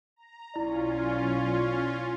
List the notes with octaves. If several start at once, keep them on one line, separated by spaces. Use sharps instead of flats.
A#5
B1 C#4 E4 F4 D5